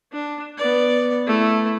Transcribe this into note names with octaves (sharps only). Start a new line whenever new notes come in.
D4
B3 D5
A3 E4